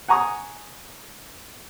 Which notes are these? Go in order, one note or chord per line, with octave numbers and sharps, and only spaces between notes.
F#5 G#5 A#5 C#6 D#6